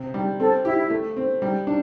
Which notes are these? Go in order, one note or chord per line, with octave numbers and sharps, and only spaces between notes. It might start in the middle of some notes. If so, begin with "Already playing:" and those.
Already playing: C3
G3
C4 A4
E4 G4
E4
A3
C4
G3
D4